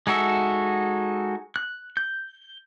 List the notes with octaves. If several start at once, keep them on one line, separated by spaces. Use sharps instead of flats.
G#3 D#4 F#4 A4 E5
F#6
G6